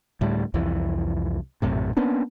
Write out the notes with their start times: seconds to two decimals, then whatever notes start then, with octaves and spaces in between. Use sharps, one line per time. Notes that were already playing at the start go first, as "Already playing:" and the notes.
0.21 D2 A2 G3
0.54 C2 F2 E3
1.62 A#1 F#2 A2 C3
1.97 A#3 B3 C#4 D4